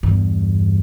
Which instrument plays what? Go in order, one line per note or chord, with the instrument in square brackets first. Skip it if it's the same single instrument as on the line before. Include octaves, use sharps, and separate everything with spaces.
[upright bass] E2 G2